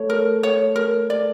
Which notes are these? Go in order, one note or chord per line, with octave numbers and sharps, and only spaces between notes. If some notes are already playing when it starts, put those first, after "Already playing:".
Already playing: A3 C#5
A#4
C#5
A#4
D5